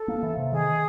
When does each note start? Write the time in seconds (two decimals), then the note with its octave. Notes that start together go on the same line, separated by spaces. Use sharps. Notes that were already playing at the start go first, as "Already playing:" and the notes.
Already playing: A4
0.08 A#3
0.23 E3
0.37 C3
0.52 D#3 G#4